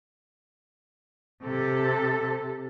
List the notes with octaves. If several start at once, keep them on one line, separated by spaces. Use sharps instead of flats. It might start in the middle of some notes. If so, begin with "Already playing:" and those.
C3 A4